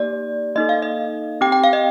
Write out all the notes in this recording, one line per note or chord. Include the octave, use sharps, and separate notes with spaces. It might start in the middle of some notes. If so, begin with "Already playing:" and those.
Already playing: A#3 D#4 G4 D5
A#3 D#4 A4 D#5
F5
D#5
C4 G4 G5
G5
F5
D#5